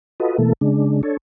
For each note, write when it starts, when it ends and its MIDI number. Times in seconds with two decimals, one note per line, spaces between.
0.20 0.38 65
0.20 0.38 66
0.20 0.38 69
0.20 0.38 71
0.20 0.38 75
0.38 0.53 47
0.38 0.53 52
0.38 0.53 57
0.38 0.53 58
0.38 0.53 69
0.61 1.02 49
0.61 1.02 56
0.61 1.02 62
1.03 1.17 62
1.03 1.17 69
1.03 1.17 73